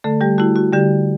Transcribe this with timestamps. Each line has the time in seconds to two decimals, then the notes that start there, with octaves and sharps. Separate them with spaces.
0.04 D3 A3 A4
0.21 G3 G4
0.38 A3 E4 F#4
0.56 F#4
0.73 D3 G3 G4